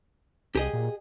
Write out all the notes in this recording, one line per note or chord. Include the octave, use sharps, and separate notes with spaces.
C2 G4 G#4 D#5
A#2